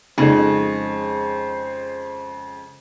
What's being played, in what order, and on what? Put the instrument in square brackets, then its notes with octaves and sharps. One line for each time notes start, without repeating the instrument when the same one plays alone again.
[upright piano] F2 G#3 [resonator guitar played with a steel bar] C#3 [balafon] D#4 A4 [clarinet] C5